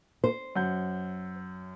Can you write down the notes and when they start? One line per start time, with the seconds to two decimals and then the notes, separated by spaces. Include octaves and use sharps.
0.24 C5
0.56 F#2 F#5 G6